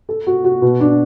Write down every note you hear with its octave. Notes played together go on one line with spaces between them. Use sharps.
A4
F#4
F#4
B2
D4